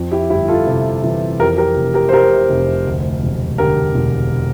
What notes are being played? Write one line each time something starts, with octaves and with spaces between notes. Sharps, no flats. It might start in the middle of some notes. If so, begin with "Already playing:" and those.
Already playing: F2
E4 G4
G1 E4 G4
F4 A4
C3
E3
F2 G4 A#4
G4 A#4
F1
G4 A#4
C5
C3 G4 A#4
F1
D2
E1
D3 G4 A#4
E1